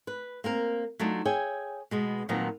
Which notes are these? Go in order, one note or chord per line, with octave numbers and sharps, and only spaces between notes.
B4
A#3 C4 A#4
F#3 A3 D4 D#4 F4
G#4 C#5 E5 G5 G#5
B2 G#3 B3
A#2 D#3 F3 F#3 B3 C4